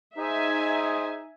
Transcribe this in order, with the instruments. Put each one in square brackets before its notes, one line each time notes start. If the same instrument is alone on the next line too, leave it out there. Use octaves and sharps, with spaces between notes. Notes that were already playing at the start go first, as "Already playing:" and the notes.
[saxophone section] D#4 [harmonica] G#4 C5 [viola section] E5 G#5